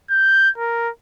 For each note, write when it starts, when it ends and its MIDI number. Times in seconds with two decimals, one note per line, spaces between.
0.10 0.50 91
0.58 0.90 70